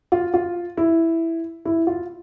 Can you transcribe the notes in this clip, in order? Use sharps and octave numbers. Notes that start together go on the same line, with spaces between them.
F4
F4
E4
E4
F4